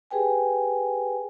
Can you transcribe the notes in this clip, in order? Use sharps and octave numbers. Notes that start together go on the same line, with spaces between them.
G4 G#4 B4 G5 G#5